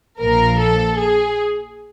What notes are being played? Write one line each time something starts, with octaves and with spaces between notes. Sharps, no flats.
A#1 A#2 F3 A#4
A4
G#4